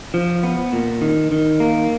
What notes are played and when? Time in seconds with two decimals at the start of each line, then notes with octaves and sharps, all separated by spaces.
0.14 F3
0.43 B3
0.73 A#2
1.02 D#3
1.32 D#3
1.60 A#3